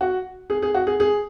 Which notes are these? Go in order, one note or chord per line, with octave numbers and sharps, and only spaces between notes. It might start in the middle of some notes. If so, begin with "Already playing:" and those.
F#4
G#4
G#4
F#4
G#4
G#4